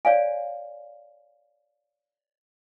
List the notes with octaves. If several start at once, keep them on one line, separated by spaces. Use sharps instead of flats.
C#5 D5 F5 G#5